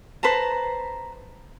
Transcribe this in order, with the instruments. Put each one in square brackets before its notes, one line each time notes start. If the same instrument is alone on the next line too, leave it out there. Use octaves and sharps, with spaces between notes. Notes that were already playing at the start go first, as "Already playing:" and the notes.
[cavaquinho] B4 C5 A5 A#5